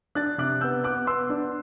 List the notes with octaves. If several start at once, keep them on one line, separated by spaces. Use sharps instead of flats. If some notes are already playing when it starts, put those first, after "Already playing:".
D4 F#6 A6
C3 D6 F#6
B3 E6 G6
B3 D6 F#6
B3 C6 E6
D4